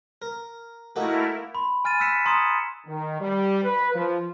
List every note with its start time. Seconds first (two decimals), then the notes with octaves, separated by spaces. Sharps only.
0.22 A#4
0.96 A3 A#3 D#4 E4 F#4 A4 A#4
1.55 B5 C6
1.85 G#5 F6 A6 D#7
2.00 E6 F#6 B6 C#7 E7
2.25 A#5 C6 D#6 G#6 C#7 E7
2.87 D#3
3.20 G3
3.63 B4
3.94 F3